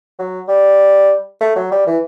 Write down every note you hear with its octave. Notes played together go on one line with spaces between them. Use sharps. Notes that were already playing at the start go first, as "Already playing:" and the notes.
F#3
G3
A3
F#3
G3
E3